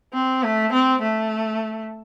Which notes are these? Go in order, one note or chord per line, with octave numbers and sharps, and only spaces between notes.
C4
A3
C4
A3